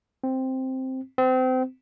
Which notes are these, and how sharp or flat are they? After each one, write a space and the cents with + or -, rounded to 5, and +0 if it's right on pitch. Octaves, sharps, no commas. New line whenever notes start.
C4 +0
C4 -30